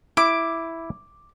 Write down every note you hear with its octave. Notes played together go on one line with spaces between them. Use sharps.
E4 D6